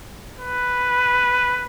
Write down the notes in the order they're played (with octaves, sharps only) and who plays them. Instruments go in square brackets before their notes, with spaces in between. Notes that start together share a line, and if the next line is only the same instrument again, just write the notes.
[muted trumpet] B4